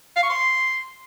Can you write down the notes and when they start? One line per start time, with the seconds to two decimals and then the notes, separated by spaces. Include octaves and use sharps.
0.16 F5
0.23 C#6
0.30 C6